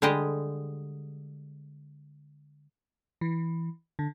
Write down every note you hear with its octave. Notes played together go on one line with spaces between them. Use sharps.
D3 G3 G#3 G4 D#5
E3
D3